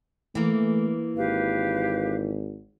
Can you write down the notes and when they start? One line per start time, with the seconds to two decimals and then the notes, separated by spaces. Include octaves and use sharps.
0.35 E3 A3 A#3
1.16 G#1 G4 B4 F5